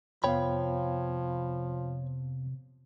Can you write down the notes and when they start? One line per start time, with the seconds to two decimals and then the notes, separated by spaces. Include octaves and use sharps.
0.24 F2 C3 F3 B3 C#5 F5 G5 B5